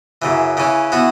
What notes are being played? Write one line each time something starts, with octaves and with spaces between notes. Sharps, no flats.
F#2 C#3 E3
C#3 E3 C#4
E3 B3 F#4